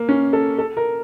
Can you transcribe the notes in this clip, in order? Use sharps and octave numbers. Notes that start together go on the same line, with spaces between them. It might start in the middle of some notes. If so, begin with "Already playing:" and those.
Already playing: A#3
C#4
A4
A4
A#4